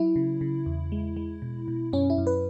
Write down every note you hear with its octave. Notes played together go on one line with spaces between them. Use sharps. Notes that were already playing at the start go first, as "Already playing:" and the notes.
Already playing: F#3 E4
C#3
C#3
E2
G#3
G#3
B2
B2
F#2 C#4
E4
F#2
B4